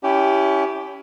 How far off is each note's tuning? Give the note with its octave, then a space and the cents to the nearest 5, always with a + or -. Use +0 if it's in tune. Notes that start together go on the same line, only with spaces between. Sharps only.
C#4 +30 E4 +5 G4 +0